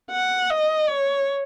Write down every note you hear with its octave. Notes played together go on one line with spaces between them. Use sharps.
F#5
D#5
C#5